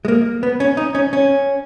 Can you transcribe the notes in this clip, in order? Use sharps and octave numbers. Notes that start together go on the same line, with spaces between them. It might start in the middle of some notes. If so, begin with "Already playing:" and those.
G#3
A#3
B3
C#4
D#4
C#4
C#4